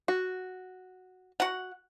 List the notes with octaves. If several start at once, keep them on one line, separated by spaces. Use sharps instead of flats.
F#4
F#4 F#5